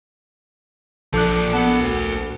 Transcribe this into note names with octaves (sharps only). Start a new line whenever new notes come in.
A#1 F3 D4 A4 D6 F#6
B3 A#4 A5
D2